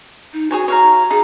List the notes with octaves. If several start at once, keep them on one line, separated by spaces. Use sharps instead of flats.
D#4
F#4 G#4 C#5 G#5
C#5 F5 A#5
D#4 G#4 A5